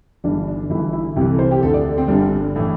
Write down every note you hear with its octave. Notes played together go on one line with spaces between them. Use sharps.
G1 G2 E3 D4
D4
G1 G2 E3 E4
E4
C2 C3 E3 G4
A4
C5
G4
D2 D3 A4
D5
C4
G1 G2 D3 G3
A2 E3